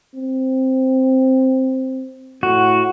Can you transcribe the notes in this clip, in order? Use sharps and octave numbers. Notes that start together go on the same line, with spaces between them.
C4
A2 F#4